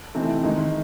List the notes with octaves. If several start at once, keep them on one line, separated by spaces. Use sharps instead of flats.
C3 E3 A3 C4 D#4
D#3 G#3 D#4